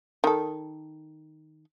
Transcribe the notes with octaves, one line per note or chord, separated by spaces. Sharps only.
D#3 A4